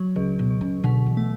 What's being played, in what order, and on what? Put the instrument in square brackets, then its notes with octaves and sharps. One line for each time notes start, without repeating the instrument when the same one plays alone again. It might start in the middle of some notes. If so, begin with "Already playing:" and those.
Already playing: [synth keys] F#3
[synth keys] C#2 [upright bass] C#3
[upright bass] B2
[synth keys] C#2
[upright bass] C#3
[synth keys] B2 [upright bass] D3
[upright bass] E3
[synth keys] A3